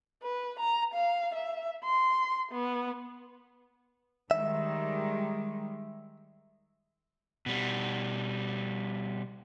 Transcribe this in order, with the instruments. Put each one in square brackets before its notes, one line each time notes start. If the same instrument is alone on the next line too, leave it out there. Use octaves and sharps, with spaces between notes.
[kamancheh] B4
A#5
F5
E5
C6
B3
[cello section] D#3 G3 G#3 [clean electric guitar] E5
[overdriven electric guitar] B2 G3